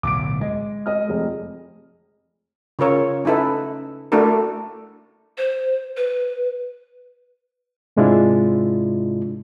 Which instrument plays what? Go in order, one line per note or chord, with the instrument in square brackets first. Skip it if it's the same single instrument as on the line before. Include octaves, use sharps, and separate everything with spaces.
[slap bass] D1 B1 A2 [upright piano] D6 D7
[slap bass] G#3 [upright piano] D#5
[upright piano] D#5 F6
F1 G#3
[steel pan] C#3 F4 A#4 C#5
C#4 D#4 E4 A4 B4
A3 D4 E4 F#4 A4 A#4
[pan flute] C5
B4
[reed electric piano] G#2 C3 G#3 D4 E4 F4